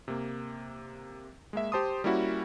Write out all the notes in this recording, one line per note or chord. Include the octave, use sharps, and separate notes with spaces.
C3 A#3
G#3 A#3 E5
G4 C5 A5 C6 D#6
G3 A#3 C#4 E4 F#4